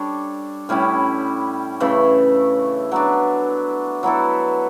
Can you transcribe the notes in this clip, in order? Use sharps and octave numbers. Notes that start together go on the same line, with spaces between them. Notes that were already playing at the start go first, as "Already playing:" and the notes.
Already playing: G3 D4 A4 C#5
A2 G3 C#4 E4
C#3 E3 A3
F#3 B3 D4
F#3 B3 E4 A4